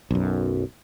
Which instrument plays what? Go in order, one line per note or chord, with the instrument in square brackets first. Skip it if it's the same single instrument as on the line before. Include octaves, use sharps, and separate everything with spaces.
[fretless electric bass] B1 F#2